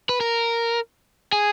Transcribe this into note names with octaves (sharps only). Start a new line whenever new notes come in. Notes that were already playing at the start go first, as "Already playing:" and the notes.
B4
A#4
G#4